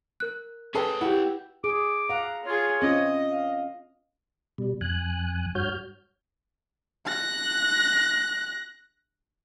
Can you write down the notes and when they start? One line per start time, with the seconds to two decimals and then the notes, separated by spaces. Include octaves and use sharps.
0.20 A#4 F#6
0.75 C#4 G#4 A4 B4 G5
1.01 E4 G4 F#5
1.64 G#4 D6
2.09 F5 F#5 A#5
2.45 F4 G#4 C#5
2.82 C4 C#4 F4 D#5
3.30 F5
4.58 B2 G3
4.81 F2 G#5 F#6
5.55 G2 F#4 C#5 F6 G6
7.07 F#6 A#6